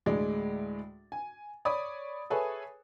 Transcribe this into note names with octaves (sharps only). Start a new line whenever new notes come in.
D2 A2 G#3 D5
G#5
C#5 D5 B5 D#6
G#4 A4 B4 C#5 E5 G#5